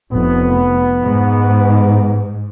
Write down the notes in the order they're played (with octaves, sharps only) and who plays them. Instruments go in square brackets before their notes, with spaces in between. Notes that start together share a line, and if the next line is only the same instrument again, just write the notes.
[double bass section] F1 [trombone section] B3
[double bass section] G#2